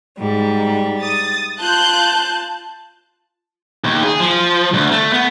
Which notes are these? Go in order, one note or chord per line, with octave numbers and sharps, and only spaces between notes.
G#2 G3
D#6 A6
F4 A5 F#6 G6
D#2
G#4
F3
D2
A3
B3